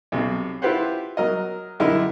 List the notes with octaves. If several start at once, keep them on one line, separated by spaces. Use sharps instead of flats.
B1 C3
E4 F4 G4 B4 C5 F#5
F#3 A#4 D#5
F#2 D3 E4 G4 A#4 D#5